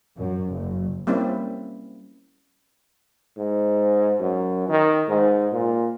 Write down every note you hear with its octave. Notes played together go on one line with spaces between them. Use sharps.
F#2
F#1
G3 A#3 C4 C#4 E4
G#2
F#2
D#3
G#2
A#2